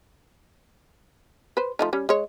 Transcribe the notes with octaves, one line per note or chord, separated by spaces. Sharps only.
B4 C5
F3 A3 D#4
G3 C#4
G#3 C#5